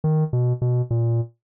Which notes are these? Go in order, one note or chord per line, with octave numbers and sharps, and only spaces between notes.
D#3
B2
B2
A#2